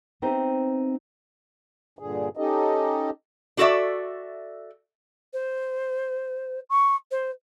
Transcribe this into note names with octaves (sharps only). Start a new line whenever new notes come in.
B3 C4 D#4 G4 C5 E5
G2 A#2 D3 G#4
C#4 D#4 G4 A4 D#5
D4 F#4 A4 A#4 D5 E5
C5
C#6
C5